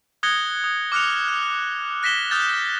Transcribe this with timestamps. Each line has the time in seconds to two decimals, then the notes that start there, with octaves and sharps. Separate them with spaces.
0.23 D#6 F#6 G#6 A#6 C#7 G7
0.64 D#6
0.92 D6 F6 F#6 C#7 F7
1.28 F#6
2.03 F#6 A#6 B6 E7 G7
2.31 D#6 F6 G6 A6